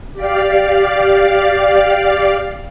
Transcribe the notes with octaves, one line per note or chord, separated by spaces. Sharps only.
G4 D5 F5